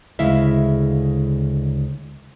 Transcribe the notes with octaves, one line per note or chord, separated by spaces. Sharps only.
D2 C#3 G#3 E4 E5 F5